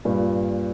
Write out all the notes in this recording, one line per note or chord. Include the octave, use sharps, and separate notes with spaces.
G2 A#2